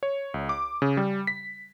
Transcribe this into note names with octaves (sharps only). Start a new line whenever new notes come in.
C#5
C#2
D6
C#3
G3
B6